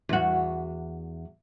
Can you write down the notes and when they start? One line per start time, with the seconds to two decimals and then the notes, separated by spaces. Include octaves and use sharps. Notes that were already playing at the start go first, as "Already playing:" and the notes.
0.09 E2 F#4